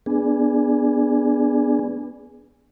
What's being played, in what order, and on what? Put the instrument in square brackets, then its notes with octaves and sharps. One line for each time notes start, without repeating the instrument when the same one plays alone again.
[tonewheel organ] B3 D4 G#4